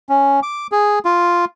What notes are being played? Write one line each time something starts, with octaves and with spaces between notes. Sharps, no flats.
C#4
D6
G#4
F4